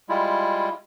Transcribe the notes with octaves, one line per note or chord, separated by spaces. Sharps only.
G3 G#3 E4 F4